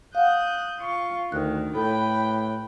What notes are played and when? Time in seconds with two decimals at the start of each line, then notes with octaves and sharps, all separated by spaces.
0.15 F5 F#5 D#6 F#6 G6
0.79 F4 C#6
1.32 D2 D#3 F#6
1.75 A2 A4 B4 G5